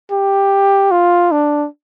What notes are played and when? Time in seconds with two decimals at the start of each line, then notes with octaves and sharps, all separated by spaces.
0.11 G4
0.91 F4
1.31 D4